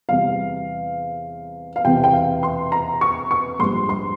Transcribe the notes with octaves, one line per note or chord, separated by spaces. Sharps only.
E2 C3 E3 G3 F5
F5
E1 E2 C3 E3 G5
G5
F5
C6
A#5
C#6
C#6
A#1 G#2 G3 C6
C6